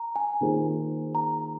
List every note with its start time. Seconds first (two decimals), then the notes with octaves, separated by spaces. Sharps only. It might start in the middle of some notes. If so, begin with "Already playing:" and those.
Already playing: A#5
0.16 G#5
0.41 D#3 A#3 F4 G#4 C5
1.15 A#5